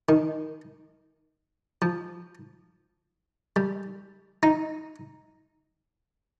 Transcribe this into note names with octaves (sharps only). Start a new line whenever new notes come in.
D#3
F3
G3
D#4